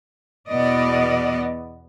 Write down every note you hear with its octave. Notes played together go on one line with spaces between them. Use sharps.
E2 B2 B3 D5 D#5